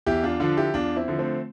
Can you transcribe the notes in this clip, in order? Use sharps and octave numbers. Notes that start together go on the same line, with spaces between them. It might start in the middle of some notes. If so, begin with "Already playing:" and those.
E2 E4 G4
D4 F4
D3 F3 D4 F4
E4 G4
E2 D4 F4
C4 E4
D3 F3
A3 C4